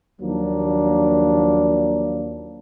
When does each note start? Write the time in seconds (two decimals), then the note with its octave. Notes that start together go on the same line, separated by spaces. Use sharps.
0.21 D#2 F3 F#3 A#3 D4